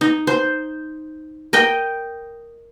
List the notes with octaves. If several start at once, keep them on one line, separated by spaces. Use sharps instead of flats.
D#4
C5
A#4 D#5 G5